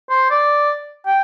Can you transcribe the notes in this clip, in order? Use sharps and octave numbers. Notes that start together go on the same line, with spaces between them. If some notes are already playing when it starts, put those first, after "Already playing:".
C5
D5
G5